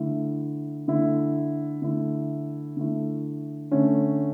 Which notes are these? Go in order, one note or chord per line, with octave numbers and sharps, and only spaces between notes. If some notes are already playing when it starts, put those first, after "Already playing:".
Already playing: D3 A3 E4
D3 A3 E4
D3 A3 E4
D3 A3 E4
D3 A3 C#4